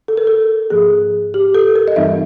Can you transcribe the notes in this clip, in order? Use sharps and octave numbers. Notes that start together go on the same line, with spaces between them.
A4
A#4
A4
G#2 F3 A#3 G#4
G4
A4
A#4
D#5
G2 E3 G3 C4 D#4 E5